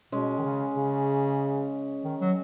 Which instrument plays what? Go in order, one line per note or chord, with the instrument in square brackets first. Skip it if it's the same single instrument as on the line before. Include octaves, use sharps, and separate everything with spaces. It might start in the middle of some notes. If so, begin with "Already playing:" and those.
[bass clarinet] B2 [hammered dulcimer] G#3 C#4
[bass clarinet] D#3
C#3
C#3
D#3
F#3